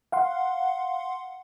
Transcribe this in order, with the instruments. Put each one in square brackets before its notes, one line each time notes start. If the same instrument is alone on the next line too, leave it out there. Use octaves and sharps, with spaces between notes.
[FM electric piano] F5 F#5 C6